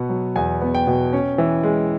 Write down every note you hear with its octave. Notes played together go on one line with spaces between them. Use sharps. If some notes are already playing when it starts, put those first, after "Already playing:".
Already playing: B2 B3
F#3
E2 G#5
B3
G5
B2
C#4
E3
G#3